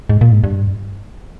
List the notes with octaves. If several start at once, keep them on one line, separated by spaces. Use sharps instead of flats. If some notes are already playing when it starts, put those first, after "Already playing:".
G#2
A#2
G#2
G2